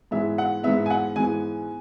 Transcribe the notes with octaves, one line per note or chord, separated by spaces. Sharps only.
G#2 E3 G#3 B3 E5
F#5
G#2 E3 G#3 B3 E5
G#5
F#5
G#2 E3 G#3 B3 G#5